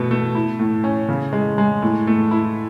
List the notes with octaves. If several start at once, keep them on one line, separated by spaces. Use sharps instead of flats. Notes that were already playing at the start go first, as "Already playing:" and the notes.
Already playing: B2 A3
A3
E4
A2
C#4
C#3
G#3
G#3
A2
A3
E4